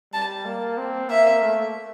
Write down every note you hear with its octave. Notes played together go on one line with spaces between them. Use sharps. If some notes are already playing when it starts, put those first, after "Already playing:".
G3 A5
A#3
C4
A#3 E5
A3